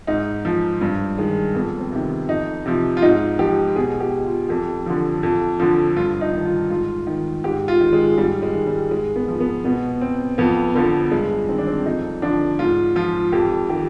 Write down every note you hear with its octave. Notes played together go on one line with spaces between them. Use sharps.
G#2 D#4
F3
G2
D#3 G#3
F2 B3
C4
C3 D#3
F2 D#4
C3 F3
F4
G#2 D#4
F3 G4
B2 G#4
G4
F4
F2 G4
D3 F3
F2
D3 F3
G2 F4
D#4
D#3
F4
G#2 F4
D#3
G#2 G4
F4
D#3
G#3
G#2 G3
G#3
D#3
G3
G#2 G#3
B3
F3
B3
B2 B3
C4
F2 B3
D3 F3 B3
G2 G#3
D#3 C4
D4
C4
F2 D#4
D3 F3 D4
G#2 F4
F3 F4
F2 G4
D#3 G4